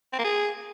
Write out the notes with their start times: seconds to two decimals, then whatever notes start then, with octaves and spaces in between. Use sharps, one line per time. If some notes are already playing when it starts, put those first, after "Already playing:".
0.13 C4
0.19 A#3
0.25 G#4